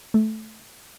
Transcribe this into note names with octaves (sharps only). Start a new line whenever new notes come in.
A3